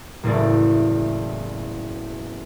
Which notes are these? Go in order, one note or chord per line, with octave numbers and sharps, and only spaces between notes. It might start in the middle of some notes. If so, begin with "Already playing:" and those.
F#1 E2 A2 A3 D5